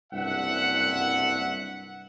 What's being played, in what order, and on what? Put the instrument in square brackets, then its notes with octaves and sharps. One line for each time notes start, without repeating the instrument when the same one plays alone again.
[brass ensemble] F#1 C2 G2 E5 F#5